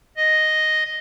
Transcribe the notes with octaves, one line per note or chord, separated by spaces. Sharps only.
D#5